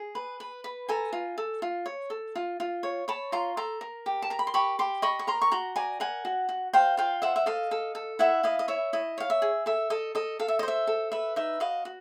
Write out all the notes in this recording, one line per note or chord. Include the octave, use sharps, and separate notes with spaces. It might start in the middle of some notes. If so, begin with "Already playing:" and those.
Already playing: G#4
B4
B4
B4
A4 G#5 A#5
F4
A4
F4
C#5
A4
F4
F4
C#5
C#5 A5 B5
F4 A#5 C6
A4 A#5 C6
A#4
G4
A5
A#4 A#5
B5
C6
G4 B5 C#6
G4 C6 D6
D#5 B5 C#6
C#6
A#4 A#5 C6
C#6
F#4 A#5 C6
D5 G#5 A#5
A#4 F#5 G#5
F#4
F#4
C5 F5 G5
F4 F5 G5
C5 E5 F#5
E5
A4 D#5 F5
A4
A4
E4 E5 F#5
E4 D#5 F5
D#5
C#5 E5
E4 D#5
C#5 F5
E5
G#4
A4 E5
A4 D#5
A4 D#5
A4 F5
E5
D#5
C5 E5
A4
B4 E5
D#4 E5
F#4 D#5 F5
F#4